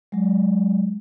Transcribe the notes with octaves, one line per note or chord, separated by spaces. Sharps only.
F#3 G#3